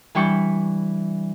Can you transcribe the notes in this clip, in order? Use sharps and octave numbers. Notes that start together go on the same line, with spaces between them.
E3 G3 D4 G5 C#6